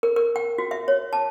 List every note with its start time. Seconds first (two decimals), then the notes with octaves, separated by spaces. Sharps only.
0.03 A#4
0.16 A#4
0.36 G5
0.58 F#4
0.71 E5
0.88 C#5
1.13 A5